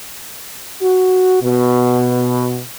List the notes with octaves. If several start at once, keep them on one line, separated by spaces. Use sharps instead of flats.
F#4
B2